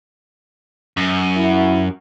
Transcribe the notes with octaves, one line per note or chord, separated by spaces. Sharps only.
F#2
E4